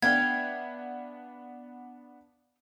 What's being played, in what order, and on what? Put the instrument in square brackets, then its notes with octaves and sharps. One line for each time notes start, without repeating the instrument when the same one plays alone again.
[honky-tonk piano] B3 D4 [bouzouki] E5 F5 G5 [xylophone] G#6